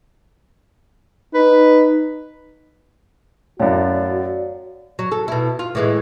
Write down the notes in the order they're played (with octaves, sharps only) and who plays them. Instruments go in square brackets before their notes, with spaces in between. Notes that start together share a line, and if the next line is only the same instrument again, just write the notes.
[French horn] D#4 [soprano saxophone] B4
[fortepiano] F#2 A2 [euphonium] F#4 [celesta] C#5 F5 [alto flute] D5
[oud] F#3
A4
B2 E4
F4
A2 E3 G#3